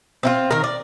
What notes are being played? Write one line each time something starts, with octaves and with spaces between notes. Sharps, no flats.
C4 E4 F4
D#3 A#4
D5